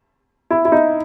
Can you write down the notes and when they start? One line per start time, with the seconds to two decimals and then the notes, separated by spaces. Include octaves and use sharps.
0.50 E4
0.65 E4
0.72 D#4